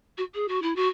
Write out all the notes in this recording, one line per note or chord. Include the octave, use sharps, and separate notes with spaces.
F#4
G#4
F#4
E4
F#4